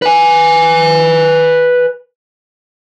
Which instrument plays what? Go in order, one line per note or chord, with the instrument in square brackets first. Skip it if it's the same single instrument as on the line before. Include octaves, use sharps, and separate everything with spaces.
[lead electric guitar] B4 G#5